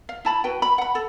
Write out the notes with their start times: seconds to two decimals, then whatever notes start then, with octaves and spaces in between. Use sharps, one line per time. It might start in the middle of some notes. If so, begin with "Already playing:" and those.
0.09 F5
0.25 E4 A5 B5
0.44 F#4 B4 G5
0.62 B5
0.78 F#5 B5
0.95 A4